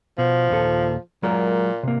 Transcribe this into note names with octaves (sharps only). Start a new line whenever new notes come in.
B2 F3
D#2 A#2 A4
A#2 F#3 G#3 A#4
C3 A#3